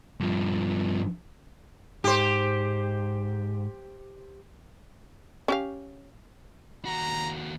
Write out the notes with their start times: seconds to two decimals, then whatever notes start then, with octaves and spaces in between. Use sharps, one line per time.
0.20 G2 F3
2.04 G#2 G4 C5
5.48 C#4 G4 F5
6.85 D#2 F#4 A#5